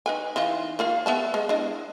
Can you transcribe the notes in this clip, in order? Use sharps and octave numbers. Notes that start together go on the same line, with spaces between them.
D#4 B4 G#5
E3 D#4 F4
A#3 F4 F5
B3 E5 A5
G#3
D4 E4 D#5